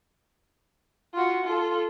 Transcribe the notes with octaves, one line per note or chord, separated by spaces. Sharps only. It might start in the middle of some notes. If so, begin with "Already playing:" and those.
F4 F#4
F4 A4